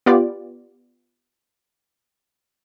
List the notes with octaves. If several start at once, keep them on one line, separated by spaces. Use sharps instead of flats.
B3 F4 G4 D5